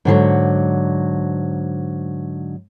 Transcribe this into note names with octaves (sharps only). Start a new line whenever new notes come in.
G#2 D3 F3 F#3